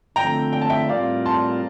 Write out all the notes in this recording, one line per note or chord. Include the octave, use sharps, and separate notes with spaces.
D3 F3 A3 C4 G5 A#5
G5
A5
E5 G5
A2 G3 C4 F4 A#4 D5 F5
A5 C6